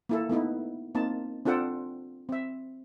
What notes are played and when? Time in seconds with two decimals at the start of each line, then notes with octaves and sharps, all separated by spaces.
0.09 A#3 E4 A4
0.29 A3 B3 D#4 E4
0.95 A#3 C4 D#4 A5
1.45 C4 D4 F4 A4 F#5 G5
2.29 C4 E5